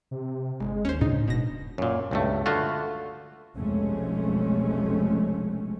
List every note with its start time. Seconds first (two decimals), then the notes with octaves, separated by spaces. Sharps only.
0.11 C3
0.60 G1 G#3
0.85 D#2 C#4 C5
1.01 A2 C#3 D4 D#4
1.28 E1 B2 A#6
1.78 F#2 A#2
2.11 C#2 G2 A3
2.46 D3 A3 F4 F#4
3.56 F1 B1 F2 G#3 A3 C#4